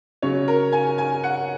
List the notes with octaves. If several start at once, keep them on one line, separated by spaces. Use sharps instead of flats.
C#3 F#3 C#4 C#5
A#4
G#5
G#5
F#5